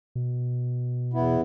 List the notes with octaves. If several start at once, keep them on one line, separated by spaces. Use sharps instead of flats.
B2
E2 B3 E4